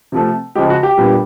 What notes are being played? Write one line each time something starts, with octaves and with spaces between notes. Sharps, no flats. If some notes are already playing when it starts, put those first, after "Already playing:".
C3 F3 A3
C#3 F3 G#3 G4
F#4
G4
A#2 G3 B3 D4